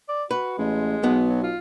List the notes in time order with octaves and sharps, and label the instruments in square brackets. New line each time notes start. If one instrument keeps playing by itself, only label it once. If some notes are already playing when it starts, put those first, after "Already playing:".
[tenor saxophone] D5
[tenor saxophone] F#4 [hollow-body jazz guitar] B4
[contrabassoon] A1 [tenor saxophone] G#3
[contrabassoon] B1 [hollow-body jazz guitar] B3
[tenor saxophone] F#3
F4